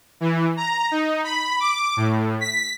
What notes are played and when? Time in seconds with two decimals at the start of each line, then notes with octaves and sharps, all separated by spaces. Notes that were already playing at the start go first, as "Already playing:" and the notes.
0.21 E3
0.57 A#5
0.91 D#4
1.24 B5
1.60 D6
1.97 A2
2.41 B6